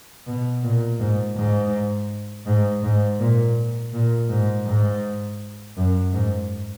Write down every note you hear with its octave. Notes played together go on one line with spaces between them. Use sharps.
B2
A#2
G#2
G#2
G#2
G#2
A#2
A#2
G#2
G#2
F#2
G#2